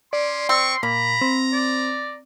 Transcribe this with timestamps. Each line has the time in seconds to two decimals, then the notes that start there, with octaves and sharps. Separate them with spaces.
0.13 C#4 D5 C6
0.49 C4 C#6
0.83 A#2 A#3 A#5 B5
1.21 C4
1.53 D5